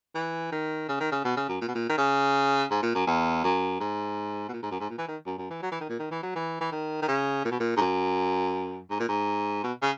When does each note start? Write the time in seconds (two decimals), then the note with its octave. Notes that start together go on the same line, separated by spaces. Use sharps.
0.15 E3
0.52 D#3
0.89 C#3
1.00 D#3
1.12 C#3
1.25 B2
1.37 C#3
1.49 F#2
1.61 A#2
1.68 B2
1.75 A#2
1.89 D#3
1.98 C#3
2.71 G#2
2.83 A#2
2.95 F#2
3.07 E2
3.44 F#2
3.80 G#2
4.49 B2
4.53 A#2
4.62 G#2
4.71 F#2
4.80 G#2
4.90 A#2
4.98 E3
5.08 D#3
5.26 F#2
5.38 F#2
5.50 E3
5.62 F#3
5.72 E3
5.80 D#3
5.89 A#2
5.99 D#3
6.11 E3
6.23 F#3
6.36 E3
6.61 E3
6.72 D#3
7.02 D#3
7.08 C#3
7.45 A#2
7.51 B2
7.60 A#2
7.77 G#2
7.81 F#2
8.90 G#2
9.00 A#2
9.09 G#2
9.64 B2
9.82 C#3